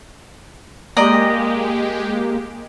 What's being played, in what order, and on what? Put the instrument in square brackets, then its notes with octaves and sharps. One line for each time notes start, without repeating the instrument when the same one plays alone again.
[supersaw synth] G#3 G4 [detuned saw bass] A#3 [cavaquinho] D5 D#5 A#5